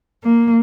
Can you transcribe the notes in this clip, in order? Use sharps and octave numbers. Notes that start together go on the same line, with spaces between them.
A#3